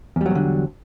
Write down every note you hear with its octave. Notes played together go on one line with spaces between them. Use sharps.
E2 B2 D3 F#3 G3